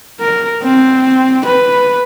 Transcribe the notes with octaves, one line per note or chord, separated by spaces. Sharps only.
A#4
C4
B4